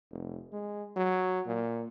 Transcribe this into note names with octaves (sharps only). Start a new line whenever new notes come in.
F1
G#3
F#3
A#2